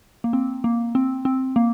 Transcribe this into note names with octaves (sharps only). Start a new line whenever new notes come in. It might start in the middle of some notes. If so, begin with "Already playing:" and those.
A#3
C4
A#3
C4
C4
A#3